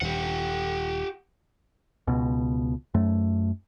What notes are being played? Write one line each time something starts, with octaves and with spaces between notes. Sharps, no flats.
D#1 G4 F#5
C#2 B2
F#2 A3